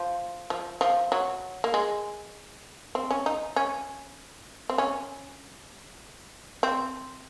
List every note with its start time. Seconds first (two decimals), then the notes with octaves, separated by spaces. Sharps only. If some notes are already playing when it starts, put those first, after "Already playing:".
Already playing: F3
0.50 F3
0.81 F3
1.12 F#3
1.64 A#3
1.74 G#3
2.95 C4
3.11 C#4
3.26 D#4
3.56 C#4
4.70 C4
4.78 C#4
6.63 C4